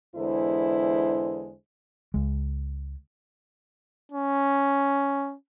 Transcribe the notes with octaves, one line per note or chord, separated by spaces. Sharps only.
E2 D3 G#3 E4 C5
C#2 G#3
C#4